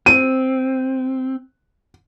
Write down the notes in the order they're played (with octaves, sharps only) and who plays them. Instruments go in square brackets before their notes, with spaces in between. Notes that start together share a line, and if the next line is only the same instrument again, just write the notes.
[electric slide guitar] C4 [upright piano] D#7